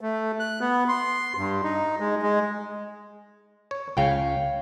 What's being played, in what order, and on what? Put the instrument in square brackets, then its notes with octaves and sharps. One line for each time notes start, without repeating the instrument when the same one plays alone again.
[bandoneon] A3
F#6
B3
C6
G2
D#4
G#3
G#3
[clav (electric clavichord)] C#5
[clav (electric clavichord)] C#2 C#3 [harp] C#5 F5 G5